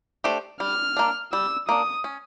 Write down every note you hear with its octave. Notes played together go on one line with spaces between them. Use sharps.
A3 D4 G4 C5
G3 F6
A#3 D4
G3 E6
A#3 D4 D#6
C#4